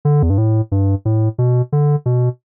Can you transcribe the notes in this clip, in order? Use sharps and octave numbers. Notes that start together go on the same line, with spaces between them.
D3
E2
G2
A2
G2
A2
B2
D3
B2